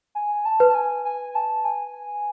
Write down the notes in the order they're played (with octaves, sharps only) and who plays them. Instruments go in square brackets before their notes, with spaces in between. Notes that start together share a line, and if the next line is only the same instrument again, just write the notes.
[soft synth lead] G#5
A5
[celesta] B4
[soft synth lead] A5
G#5
G#5
A5
G#5